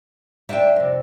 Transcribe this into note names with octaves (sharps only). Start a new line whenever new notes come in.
D4 C5 E5 F5 G5
F2 C3